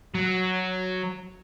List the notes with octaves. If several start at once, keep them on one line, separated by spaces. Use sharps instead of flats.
F#3